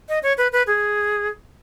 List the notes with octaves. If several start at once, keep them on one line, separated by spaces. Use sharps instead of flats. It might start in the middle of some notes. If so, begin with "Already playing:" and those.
D#5
C#5
B4
B4
G#4